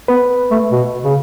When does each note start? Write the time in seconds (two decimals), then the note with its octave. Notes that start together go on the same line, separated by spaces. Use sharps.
0.08 B3 B4
0.51 A3
0.72 B2
1.04 C#3